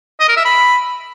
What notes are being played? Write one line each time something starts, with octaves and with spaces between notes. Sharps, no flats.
D#5
A#4
E5
B5